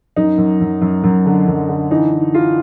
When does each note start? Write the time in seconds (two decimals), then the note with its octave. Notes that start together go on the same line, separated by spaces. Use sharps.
0.16 F#2 D#4
0.38 F#2
0.61 F#2
0.81 F#2
1.04 F#2
1.26 D3
1.48 F#2
1.69 D3
1.91 E3 D#4
2.12 E3
2.34 E3 F4